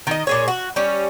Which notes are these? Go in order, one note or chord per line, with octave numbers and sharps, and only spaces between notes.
D#3 D#5
A#2 G#4 C#5
F#4
G3 C#4